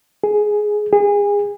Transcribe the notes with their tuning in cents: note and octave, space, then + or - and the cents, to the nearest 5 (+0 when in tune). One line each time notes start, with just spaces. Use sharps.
G#4 +10
G#4 -30